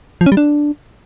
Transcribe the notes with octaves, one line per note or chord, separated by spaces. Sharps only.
F3
C#4
G3
D4